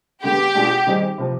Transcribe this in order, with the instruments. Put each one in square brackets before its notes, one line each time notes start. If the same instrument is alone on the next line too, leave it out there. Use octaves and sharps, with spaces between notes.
[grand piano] D3 G#3 B3 [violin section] G4
[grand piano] B2 G#3 D4 F4 G#4
D#3 G3 C4 D#4 G#4
C3 F3 C4